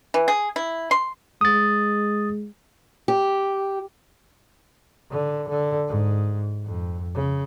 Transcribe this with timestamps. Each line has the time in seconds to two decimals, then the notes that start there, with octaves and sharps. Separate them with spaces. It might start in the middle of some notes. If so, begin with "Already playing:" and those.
0.14 E3
0.28 G#4
0.56 E4
0.91 C6
1.41 G#3 D#6 A6
3.08 G4
5.11 D3
5.49 D3
5.88 G#2
6.65 F2
7.15 C#3